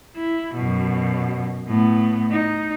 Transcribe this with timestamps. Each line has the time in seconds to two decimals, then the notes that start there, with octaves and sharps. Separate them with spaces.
0.17 E4
0.54 F#2 B2
1.67 A2 B3
2.31 D#4